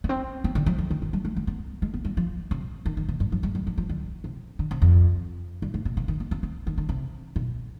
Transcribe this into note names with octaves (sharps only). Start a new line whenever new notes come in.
B3
C4
B3
D3
F3
D3
D3
D#3
G3
G#3
G#3
B3
G#3
B3
G3
F3
C3
D#3
D#3
B2
G2
F3
G3
G3
F3
F3
D3
C3
D3
C3
F2
G2
G#2
B2
C3
D#3
B3
C4
C4
D#3
D3
C3
B2